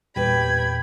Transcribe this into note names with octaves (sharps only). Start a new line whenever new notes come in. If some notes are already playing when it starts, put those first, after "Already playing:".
E2 A#2 G3 B4 G5 B5 G#6